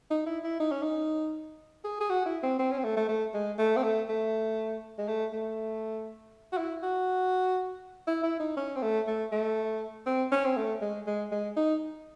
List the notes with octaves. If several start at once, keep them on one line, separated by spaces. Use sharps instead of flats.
D#4
E4
E4
D#4
C#4
D#4
G#4
G#4
F#4
E4
C4
C4
C#4
C4
A3
A3
A3
G#3
A3
C4
A3
A3
G#3
A3
A3
F#4
E4
F#4
E4
E4
D#4
C#4
C4
A3
A3
A3
C4
C#4
C4
A3
G#3
G#3
G#3
D#4